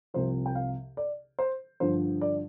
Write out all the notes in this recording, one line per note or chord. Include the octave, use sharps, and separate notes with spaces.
C2 C3 F3 C5
G5
F5
D5
C5
G2 D3 F3 C5
D5